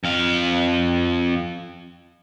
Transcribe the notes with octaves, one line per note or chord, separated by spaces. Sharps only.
F2 F5